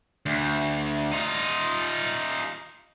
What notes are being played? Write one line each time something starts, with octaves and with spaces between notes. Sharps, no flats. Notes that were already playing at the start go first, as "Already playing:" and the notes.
D2
D#4 F4